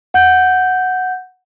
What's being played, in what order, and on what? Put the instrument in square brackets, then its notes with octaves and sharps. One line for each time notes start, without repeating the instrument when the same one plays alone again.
[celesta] F#5 G6